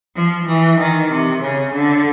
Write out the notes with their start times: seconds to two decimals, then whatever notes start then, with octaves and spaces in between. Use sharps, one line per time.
0.16 F3
0.47 E3
0.79 D#3
1.10 C3
1.42 C#3
1.74 D3